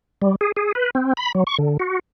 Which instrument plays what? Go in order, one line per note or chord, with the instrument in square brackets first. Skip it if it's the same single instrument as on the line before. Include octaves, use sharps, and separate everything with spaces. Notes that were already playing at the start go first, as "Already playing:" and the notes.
[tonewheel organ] G3
G#4
G#4
B4
C4
B5
F#3
C#6
D3
F#4